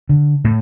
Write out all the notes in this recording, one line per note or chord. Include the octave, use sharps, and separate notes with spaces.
D3
A2